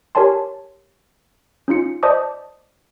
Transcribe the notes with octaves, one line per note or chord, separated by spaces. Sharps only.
G4 A#4 C#5 G#5 A5 C6
C#4 D#4 F4 C#7
C5 D5 D#5 A5 D6 D#6